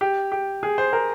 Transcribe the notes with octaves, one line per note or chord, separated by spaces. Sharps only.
G4
G4
G#4
C5
A#4